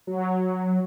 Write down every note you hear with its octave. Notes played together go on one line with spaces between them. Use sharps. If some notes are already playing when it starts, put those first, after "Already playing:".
F#3